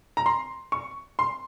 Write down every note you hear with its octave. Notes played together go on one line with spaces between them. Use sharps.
A#5
C6
C#6
C6